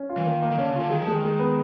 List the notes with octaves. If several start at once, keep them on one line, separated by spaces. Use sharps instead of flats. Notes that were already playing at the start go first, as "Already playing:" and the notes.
Already playing: C#4
F4
E3
D#3 A#3
A#3
D#3
D3 C#4
C#3
D3 F4
D#3 G#4
F3
G#3
D#3
G#3
B3